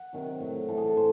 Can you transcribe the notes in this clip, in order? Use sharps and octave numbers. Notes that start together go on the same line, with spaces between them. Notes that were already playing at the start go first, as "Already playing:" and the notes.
Already playing: F#5
C3 D#3 F#3
A2 F#3
A2 E3 A4
G#4
A4
A2 C5